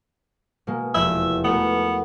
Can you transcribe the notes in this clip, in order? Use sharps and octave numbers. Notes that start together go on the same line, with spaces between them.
B2 G#3 A#3
F1 E2 E5
A3 B3 F#4 A#4